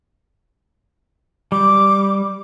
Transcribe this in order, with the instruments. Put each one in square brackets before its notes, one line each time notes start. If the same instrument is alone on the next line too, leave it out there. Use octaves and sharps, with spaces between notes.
[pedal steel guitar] G3 [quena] D6